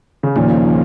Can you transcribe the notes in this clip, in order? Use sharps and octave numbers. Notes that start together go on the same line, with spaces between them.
C#3
D#2 A#2 C#3 F3